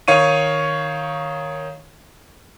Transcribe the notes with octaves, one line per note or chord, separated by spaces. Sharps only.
D#3 C#5 F5 C#6 D#7